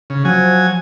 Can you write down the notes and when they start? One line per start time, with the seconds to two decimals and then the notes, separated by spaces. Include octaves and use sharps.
0.10 C#3
0.25 F3 F#3 G#5